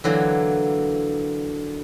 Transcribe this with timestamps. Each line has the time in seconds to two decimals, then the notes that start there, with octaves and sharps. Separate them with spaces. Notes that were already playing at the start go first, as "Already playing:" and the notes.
0.04 D3 E3 F#3 A#3